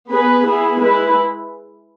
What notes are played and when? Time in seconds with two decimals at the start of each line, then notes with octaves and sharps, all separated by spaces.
0.11 B3 G#4 B4
0.45 B3 E4 G#4
0.80 G#3 E4 B4